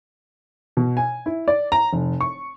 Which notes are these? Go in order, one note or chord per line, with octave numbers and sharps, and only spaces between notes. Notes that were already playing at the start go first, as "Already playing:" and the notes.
B2
G#5
E4
D5
A#5
F1
C#6